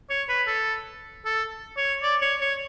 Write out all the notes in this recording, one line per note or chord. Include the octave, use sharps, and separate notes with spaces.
C#5
B4
A4
A4
C#5
D5
C#5
C#5